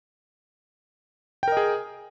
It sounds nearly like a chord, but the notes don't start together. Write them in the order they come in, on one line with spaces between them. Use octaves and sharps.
G5 A#4 D#5 G#4